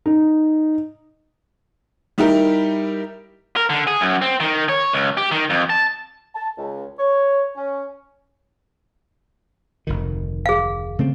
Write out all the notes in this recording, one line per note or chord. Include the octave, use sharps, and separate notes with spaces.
D#4
G3 D#4 E4 G4 A#4
A#4
D3
G#4
F#2
C4
D#3
C#5
C#2
G4
D#3
F2
A5
A5
C#2
C#5
C#4
F1 D2 D#3
G#4 F5
C#3 A3 C4